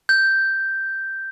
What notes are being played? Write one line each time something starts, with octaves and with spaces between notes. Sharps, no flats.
G6